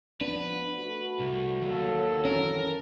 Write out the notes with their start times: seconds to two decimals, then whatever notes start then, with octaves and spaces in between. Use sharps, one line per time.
0.21 F3 B3 D4 B4
0.76 A3 F#4
1.19 C2
1.62 D#2 F#3 A4
2.25 F#2 E3 C#4 A#4